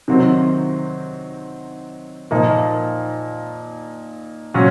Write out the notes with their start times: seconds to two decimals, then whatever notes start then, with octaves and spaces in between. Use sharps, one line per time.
0.08 C3 D#3 F#3 C4
2.31 A#2 F3 A#3 D#4
4.54 A#2 F#3 C#4